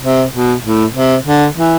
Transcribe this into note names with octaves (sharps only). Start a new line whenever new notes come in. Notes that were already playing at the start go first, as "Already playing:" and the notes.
C3
B2
A2
C3
D3
E3